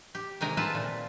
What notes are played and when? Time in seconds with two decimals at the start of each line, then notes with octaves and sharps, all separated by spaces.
0.15 G4
0.41 C3 D#3 G#3 G5 G#5 A#5
0.57 C4 F4 B4 A5
0.75 A#2